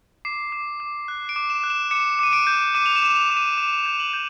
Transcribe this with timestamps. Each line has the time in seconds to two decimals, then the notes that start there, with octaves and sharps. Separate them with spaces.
0.25 D6 C7
0.52 D6
0.80 D6
1.08 F#6
1.29 D7
1.36 D6
1.50 E7
1.64 F#6
1.70 E7
1.91 D6 C#7
2.19 D6 D#7
2.33 D7
2.47 G6
2.75 D6 D#7
2.86 F7
2.95 E7
3.02 D6
3.16 F7
3.30 D6
3.37 D#7
3.58 D6
3.86 G6
4.00 F#7
4.13 G6